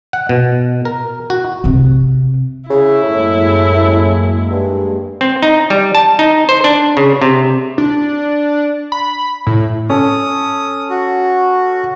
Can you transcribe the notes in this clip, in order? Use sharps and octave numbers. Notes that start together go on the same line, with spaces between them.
F#5
B2
A#4
F#4
C3 C4
C#3 E4
F#2 A2 G#3 A#3
G2
C4
D#4
G3
A5
D#4
C5
D4
C#3
C3
D4
B5
A2
C#4 A4 D#6
F#4